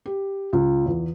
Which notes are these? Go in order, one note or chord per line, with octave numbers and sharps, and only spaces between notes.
G4
C#2
E2